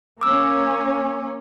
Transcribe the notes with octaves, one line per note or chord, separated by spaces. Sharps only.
A#3 C#4 D6 E6